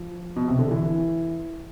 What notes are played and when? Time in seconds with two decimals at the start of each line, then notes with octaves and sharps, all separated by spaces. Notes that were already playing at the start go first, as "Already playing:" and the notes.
Already playing: F3
0.36 B2
0.48 C3
0.59 D3
0.71 E3